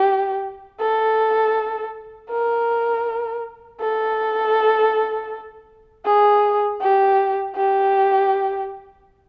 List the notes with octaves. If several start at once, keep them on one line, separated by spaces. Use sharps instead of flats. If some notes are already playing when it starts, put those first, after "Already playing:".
Already playing: G4
A4
A#4
A4
G#4
G4
G4